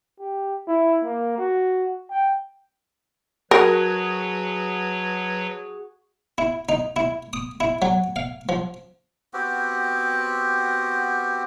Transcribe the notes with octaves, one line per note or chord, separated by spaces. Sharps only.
G4
E4
A#3
F#4
G5
F#3 F#4 G#4 A#4 B4 C#5 A5
E4
D#4
E4
D#6
E4
F#3
F5
F3
B3 C4 F#4 G4